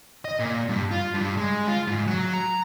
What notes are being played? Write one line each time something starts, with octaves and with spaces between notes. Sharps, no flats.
D#5
A#2
G2
F4
G2
G#3
F4
G#2
F#3
A#5